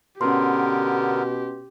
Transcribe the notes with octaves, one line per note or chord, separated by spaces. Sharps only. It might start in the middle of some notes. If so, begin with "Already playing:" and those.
B2 D3 B3 C#4 G4 A#4 C6